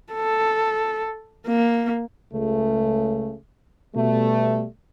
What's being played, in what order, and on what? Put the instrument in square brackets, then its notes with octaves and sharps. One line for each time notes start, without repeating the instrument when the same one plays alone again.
[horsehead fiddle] A4
A#3
[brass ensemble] C#2 C#3 A3
B2 G3 A3